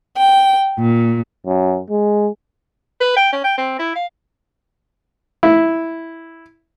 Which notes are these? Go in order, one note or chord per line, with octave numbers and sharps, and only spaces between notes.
G5
A#2
F#2
G#3
B4
G5
C#4
G5
C4
E4
F5
E4